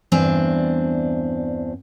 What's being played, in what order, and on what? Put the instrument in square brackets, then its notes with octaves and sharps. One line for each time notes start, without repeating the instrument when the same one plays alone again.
[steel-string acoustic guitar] E2 G2 C4 D4 G#5